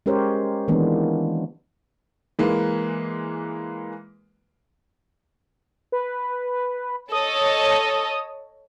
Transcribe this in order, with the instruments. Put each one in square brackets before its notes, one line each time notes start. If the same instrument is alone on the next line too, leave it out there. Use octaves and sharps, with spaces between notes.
[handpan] G#3 C#4 G4 A#4 C5 C#5
D#3 E3 G#3 A#3 B3 D4
[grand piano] E3 G#3 A#3 B4
[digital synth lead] B4
[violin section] A4 C#5 D#5 [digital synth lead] D#6